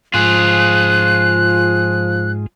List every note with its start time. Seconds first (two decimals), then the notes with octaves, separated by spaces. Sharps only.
0.14 G#2 F3 F4 G#4 F#6